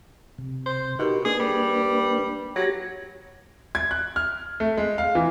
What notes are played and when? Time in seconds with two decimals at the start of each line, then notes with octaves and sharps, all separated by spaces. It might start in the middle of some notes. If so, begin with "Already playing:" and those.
0.38 C3
0.66 C5
0.99 B2 D#4 G4 A#4
1.25 A#3 D4 G#4 B4
1.40 G3
2.56 F#3 F#4 G4 A#6
3.75 G#6
3.91 F#6
4.16 F6
4.60 A3
4.77 G#3
4.98 F5
5.15 E3